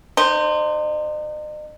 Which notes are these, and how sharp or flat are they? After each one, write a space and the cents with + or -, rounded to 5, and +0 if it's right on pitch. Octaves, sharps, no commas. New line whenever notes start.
D#4 -40 C5 +0